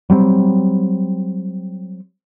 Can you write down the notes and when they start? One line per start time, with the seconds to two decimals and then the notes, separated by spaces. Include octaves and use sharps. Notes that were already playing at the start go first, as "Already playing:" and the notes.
0.10 F#3 G3 A#3 C4